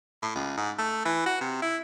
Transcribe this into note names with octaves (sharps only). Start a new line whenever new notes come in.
A2
C#2
G#2
A3
E3
F#4
C3
E4